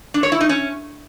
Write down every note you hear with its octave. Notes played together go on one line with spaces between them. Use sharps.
D4
C#5
E4
D#4
C#4